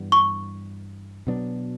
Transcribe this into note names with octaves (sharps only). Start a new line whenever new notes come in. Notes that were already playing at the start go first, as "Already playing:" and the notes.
Already playing: G2 E3 G3 B3
C#6
B2 F#3 B3 D4